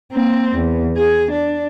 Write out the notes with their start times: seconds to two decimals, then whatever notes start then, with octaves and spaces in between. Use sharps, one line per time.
0.12 A#3 C4
0.56 E2
0.97 G#4
1.31 D4